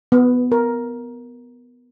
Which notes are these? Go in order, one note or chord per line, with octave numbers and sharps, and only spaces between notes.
B3
A#4